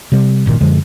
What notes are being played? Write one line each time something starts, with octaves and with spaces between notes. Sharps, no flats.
C3 G3
G1 A#2 D#3
F#2 D3 F3 G#3